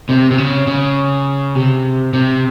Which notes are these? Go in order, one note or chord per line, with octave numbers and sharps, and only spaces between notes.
C3
C3
C#3
C#3
C3
C3